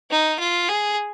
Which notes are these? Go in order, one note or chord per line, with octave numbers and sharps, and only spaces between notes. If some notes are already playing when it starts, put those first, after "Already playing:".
D#4
F4
G#4